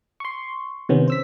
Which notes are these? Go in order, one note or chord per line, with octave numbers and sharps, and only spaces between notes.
C6 C#6
C3 D#3 B3 C#4
C5 E6 B6